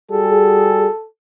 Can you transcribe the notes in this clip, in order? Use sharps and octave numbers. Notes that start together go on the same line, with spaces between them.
G3 F#4 G#4 A4